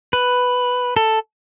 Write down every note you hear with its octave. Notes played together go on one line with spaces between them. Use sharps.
B4
A4